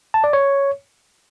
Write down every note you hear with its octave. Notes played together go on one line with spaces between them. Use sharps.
A5
D5
C#5